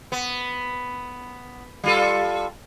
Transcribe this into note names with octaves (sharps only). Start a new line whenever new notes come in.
B3
G3 F4 A4